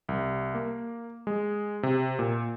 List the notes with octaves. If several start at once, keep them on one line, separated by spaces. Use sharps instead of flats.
C2
A#3
G#3
C3
A#2